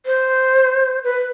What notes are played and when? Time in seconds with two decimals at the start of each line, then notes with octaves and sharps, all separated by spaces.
0.06 C5
1.04 B4